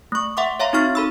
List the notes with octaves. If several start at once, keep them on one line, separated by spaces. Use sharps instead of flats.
A3 C#6
E5 F#5 C6 D6
C#5 E5 F5 A#5 C6
C4 D#4 F#4 C#6 F6 A6
A4 B5 E6